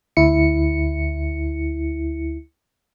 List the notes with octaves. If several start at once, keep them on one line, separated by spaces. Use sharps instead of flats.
D2 E4 C#7